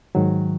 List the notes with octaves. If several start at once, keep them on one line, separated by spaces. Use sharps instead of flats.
G#2 D#3 F#3